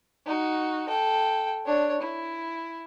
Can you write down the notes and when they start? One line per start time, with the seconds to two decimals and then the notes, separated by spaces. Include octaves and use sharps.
0.26 D#4 F#4
0.88 A4 G5
1.66 D4 C#5
2.01 E4